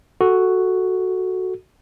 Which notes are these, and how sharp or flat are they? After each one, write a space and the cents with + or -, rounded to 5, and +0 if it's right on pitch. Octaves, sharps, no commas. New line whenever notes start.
F#4 +0 A4 +0